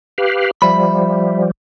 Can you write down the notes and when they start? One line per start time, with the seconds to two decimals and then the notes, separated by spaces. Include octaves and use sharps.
0.18 G4 B4 F5
0.62 F3 G3 E5 B5